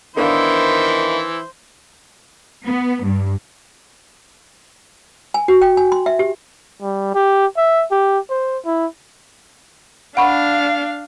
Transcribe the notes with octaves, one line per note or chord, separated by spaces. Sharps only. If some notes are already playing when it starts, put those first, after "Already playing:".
D#3 E3 B3 D4 E4 C5 F5
B3
G2
G#5
F#4
G5
G#5
C6
E5
G4
G3
G4
E5
G4
C5
E4
D4 F5 F#5 B5 C#6